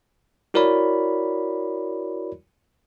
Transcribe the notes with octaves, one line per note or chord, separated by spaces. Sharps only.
E4 F#4 A#4 C#5 D5 B5